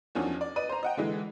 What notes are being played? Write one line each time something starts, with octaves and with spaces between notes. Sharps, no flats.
E2 D#3 F3 F#3 C#4 D4
D5
B4 D5 D#5 D#7
C5 A#5
D#5 F#5 G5
D3 E3 G#3